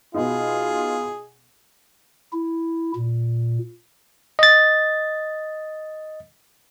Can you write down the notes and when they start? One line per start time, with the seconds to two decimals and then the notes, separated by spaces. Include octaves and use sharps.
0.14 B2 B3 D#4 F4 G#4
2.33 E4
2.96 A#2
4.39 D#5 A6